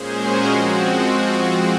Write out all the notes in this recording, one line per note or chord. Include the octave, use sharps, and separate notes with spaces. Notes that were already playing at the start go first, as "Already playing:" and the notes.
Already playing: A#2 G#3 C#4 G#4 C5
F#4 A#4
F3 G#3 C4 F#4